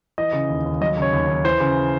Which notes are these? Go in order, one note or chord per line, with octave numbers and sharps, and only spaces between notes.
E3 D#5
C#3
D#2
D#2
F#3 D#5
C#3
C#5
D#2
D#2
E3 C5
C#3